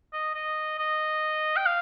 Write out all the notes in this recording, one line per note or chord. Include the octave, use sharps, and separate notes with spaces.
D#5
D#5
D#5
G5
F5